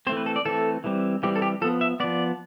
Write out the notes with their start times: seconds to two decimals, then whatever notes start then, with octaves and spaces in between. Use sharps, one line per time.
0.07 E3 A3 C4 C5
0.17 B4
0.26 A4
0.36 D5
0.45 E3 A3 C4 A4
0.84 E3 G3 C4
1.23 E3 G3 C4 G4
1.36 A4
1.42 G4
1.61 F3 B3 A4
1.81 E5
2.00 F3 B3 D5